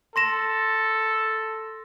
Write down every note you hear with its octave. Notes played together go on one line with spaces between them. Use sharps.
A4 C6 A#6 E7